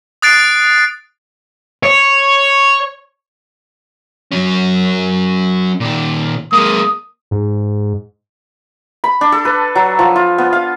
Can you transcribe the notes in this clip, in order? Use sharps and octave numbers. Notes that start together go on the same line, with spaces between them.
D#6 F#6 A6 C7 D7
C#5
F#3 C#4
A#2 D#3
G#3 A#3 D#6
G#2
B5
D4
A4
B4
F#3
F3
F4
B3
F5